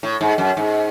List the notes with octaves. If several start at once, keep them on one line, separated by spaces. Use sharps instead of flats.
A2
G#2
F#2
G#2